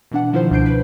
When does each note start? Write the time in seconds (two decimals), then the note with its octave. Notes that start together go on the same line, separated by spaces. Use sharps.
0.11 B2 E3 D4 F#5
0.32 D3 D#3 F3 E4 F4 C5
0.51 C#2 B2 D4 G6 C7 D7
0.66 B4